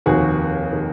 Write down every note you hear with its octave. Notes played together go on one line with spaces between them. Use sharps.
F1 D#2 D#3 F#4 G#4
D#3